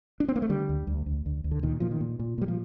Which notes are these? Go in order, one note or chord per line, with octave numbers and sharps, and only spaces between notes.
D4
C4
A#3
A3
D3 G3
D2
D2
D2
D2
D2
D3
A#2 D#3
A#2 F3
D#3
A#2
A#2
A#2 G3
F3